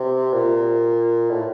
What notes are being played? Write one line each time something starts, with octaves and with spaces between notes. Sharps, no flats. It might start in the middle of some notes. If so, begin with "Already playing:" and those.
Already playing: C3
A#2
A2